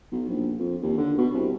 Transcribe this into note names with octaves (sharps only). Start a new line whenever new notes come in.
B1
A#1
F2
D#2
D3
B2
C2